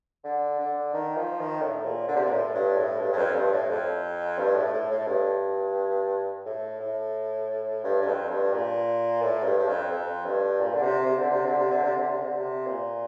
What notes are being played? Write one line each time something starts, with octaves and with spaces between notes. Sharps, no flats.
D3
D3
D#3
F3
D#3
A2
A#2
D3
C3
A#2
A2
G2
A2
G2
G2
F2
G2
A2
F2
G2
A2
A2
A2
G2
A2
A2
G2
G2
F2
G2
A#2
A2
G2
G2
F2
F2
G2
A#2
D3
C3
C3
D3
C3
D3
C3
D3
C3
D3
C3
D3
C3
A#2